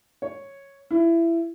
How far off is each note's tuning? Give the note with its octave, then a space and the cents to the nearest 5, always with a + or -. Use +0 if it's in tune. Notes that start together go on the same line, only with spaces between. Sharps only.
C#5 -5
E4 +20